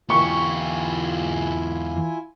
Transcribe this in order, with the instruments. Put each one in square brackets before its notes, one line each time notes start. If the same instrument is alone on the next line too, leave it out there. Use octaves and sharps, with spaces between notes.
[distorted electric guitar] E2 G4 [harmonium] E4 F4 G#5 [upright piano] C#6